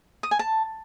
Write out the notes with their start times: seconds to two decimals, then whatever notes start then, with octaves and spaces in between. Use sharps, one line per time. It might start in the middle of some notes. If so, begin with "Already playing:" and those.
0.23 D#6
0.31 G#5
0.39 A5